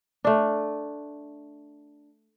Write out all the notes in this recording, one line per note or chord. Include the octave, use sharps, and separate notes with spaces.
A3 D4